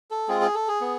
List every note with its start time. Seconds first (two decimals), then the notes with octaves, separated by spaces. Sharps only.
0.11 A4
0.28 G#3 C4 F4 G#4
0.41 G#4
0.55 A4
0.68 G#4
0.81 B3